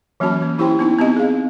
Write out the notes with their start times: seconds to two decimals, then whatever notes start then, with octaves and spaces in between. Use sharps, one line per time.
0.20 E3 F#3 A#3 C#4 F#4 A5
0.42 A#3
0.58 C#4 E4 G4 C5 G5 C6
0.79 B3 D#4 E4
0.99 B3 C4 G4 D#5
1.17 G#4 F5